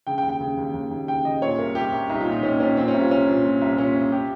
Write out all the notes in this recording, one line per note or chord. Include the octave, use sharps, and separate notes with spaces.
C#3 G5
G5
D#2
G5
C#3
D#2
D#2
D#2
C#3 G5
C#3 D#5
A#2 C#5
C2 A#4
C2 G4
C2
C2 D#4
F4
A#2
D#4
A#2 C#4
A#2 C#4
A#2 C4
C#4
C2
F4
C2 C#4
A#2
A#2
C2
A#2 C#4
C2
G4